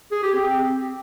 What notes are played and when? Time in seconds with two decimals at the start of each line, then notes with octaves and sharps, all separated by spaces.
0.11 G#4
0.23 G4
0.34 C4